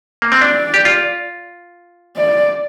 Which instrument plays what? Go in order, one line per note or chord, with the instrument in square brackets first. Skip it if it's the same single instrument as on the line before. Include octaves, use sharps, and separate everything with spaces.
[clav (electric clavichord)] A#3
C4
[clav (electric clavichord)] D4 [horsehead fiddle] D5
[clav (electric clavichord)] G4
F4
[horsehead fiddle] D5